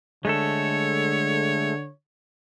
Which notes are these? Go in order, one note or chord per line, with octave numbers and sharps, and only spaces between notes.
D3 G#3 A3 A4 C#5